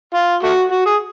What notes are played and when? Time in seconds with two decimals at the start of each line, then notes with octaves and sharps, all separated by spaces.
0.14 F4
0.43 A3 F#4
0.71 F#4
0.86 G#4